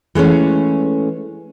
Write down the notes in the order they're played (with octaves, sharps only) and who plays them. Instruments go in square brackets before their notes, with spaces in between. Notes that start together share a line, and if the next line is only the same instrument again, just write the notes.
[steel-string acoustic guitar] E3 G#3 A3 C#4